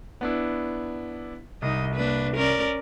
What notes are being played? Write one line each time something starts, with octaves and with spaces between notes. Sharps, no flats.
B3 D4 E4
C2 D#4 D#5
A#3 D4 B4
C#4 A#4 D5